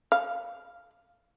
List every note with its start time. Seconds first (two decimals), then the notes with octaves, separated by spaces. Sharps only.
0.12 F5